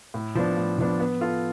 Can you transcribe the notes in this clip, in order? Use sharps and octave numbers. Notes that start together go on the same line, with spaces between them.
A2
F3 B3 D4
A2
F3 B3 D4
B3
F4 A4